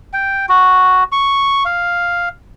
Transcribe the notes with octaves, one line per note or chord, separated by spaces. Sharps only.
G5
F#4
C#6
F5